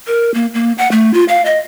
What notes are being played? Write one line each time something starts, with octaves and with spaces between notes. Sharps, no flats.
A#4
A#3
A#3
F#5
A3
F4
F5
D#5